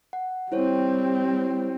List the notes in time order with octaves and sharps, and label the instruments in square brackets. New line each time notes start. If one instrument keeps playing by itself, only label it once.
[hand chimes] F#5
[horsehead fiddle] G3 C4 [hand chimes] E4 C5 C#5